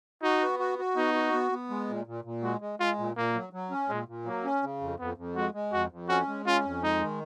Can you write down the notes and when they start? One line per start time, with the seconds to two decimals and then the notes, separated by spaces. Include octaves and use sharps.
0.23 D#4 F#4
0.41 B3
0.59 F#4
0.79 F#4
0.96 B3 D#4
1.15 F#4
1.33 B3
1.52 B3
1.70 G#3
1.89 A#2
2.07 A#2
2.24 A#2
2.42 G#3 F#4
2.61 G#3
2.79 G#3 F4
2.99 A#2
3.17 A#2 A#3
3.34 F#3
3.53 F#3
3.71 C#4
3.89 A#2 G#3
4.08 A#2
4.26 F#3 A#3
4.44 C#4
4.63 C#3
4.81 F2
4.99 F2 B3
5.17 F2
5.36 G#3 F#4
5.54 G#3
5.72 F2 F#4
5.92 F2
6.09 C#4 F#4
6.28 G#3
6.46 C#4 F4
6.65 F2
6.83 G#3 D#4
7.02 D#3